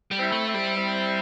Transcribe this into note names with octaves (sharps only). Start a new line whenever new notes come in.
G3
C4 E4
A3
C4 E4
G3
C4 E4